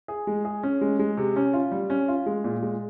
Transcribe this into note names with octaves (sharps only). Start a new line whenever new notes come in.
G#4
G#3
G#4
C#4
G#3
G#3
C3
C#4
F4
G3
C#4
F4
G#3
A#2
G#3